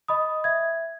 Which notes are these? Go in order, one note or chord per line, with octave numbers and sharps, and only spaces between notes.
D#5 B5 D#6
E5 G#6